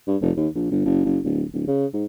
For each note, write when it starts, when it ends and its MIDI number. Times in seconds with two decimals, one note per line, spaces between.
0.07 0.16 43
0.22 0.31 29
0.37 0.48 39
0.55 0.67 34
0.71 0.81 31
0.85 1.01 30
1.05 1.19 30
1.24 1.44 26
1.54 1.63 26
1.67 1.86 49
1.94 2.05 44